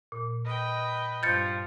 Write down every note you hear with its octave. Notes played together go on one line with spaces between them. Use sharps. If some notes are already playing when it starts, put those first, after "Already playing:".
A#2
B4 D#5 G5
G2 F3 F6 G6 A6 C#7